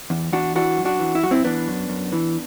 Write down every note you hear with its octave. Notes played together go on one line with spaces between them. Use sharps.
E2
E2 D4 F#4
E3 D4 F#4
F#2
D4 F#4
E3
E4
F#2 F#4
C4 E4
E3 B3 D4
F#2
F#2
E3